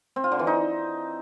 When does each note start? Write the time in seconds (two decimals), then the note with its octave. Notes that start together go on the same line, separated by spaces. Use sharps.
0.16 C4
0.24 F4
0.32 D3
0.39 E3
0.47 D#4